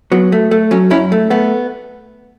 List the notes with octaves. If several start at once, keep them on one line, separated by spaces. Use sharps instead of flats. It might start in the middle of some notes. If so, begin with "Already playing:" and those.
F#3 B3
A3
A3
F#3 C#4
F#2 C#4 E4
A3
A3 B3